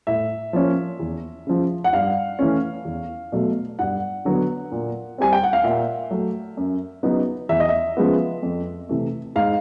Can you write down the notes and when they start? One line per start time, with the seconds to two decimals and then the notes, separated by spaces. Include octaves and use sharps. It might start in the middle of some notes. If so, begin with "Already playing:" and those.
0.07 A2 E5
0.53 F3 A#3 C#4
1.00 E2
1.47 C#3 F3
1.84 F#5
1.93 G2 F5
2.39 E3 A3 C#4
2.85 E2
3.32 B2 F#3 A3
3.79 G2 F#5
4.25 D3 F#3 B3
4.72 A#2
5.18 G3 C4 G#5
5.33 G5
5.43 F#5
5.53 F5
5.64 A#2 E5
6.11 F#3 A3
6.57 F#2
7.03 C#3 F#3 B3 D#4
7.49 E2 E5
7.60 D#5
7.69 E5
7.97 C#3 F3 G#3 B3
8.43 F2
8.89 C3 E3 A3
9.36 G#2 F5